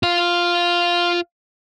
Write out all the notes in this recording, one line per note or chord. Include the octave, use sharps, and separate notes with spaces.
F4 F5